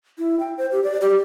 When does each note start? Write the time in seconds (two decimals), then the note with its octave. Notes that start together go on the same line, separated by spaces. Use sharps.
0.18 E4
0.40 G5
0.58 C5
0.72 G4
0.84 D5
1.01 G4